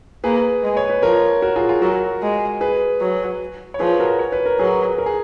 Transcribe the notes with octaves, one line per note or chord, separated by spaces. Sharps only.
A#3 G#4 B4
G#3
C#5
B4
F3 A#4 C#5
F#4 A#4
F4 G#4
F4 G#4
F#3 F#4 A#4
G#3
G#4 B4
F#3
C#5
F3 G#4 B4
F#4 A#4
C#5
B4
A#4
F#3 G#4 B4
A#4
G#4